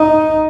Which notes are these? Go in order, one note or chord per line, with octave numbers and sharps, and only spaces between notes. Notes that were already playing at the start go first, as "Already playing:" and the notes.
Already playing: D#4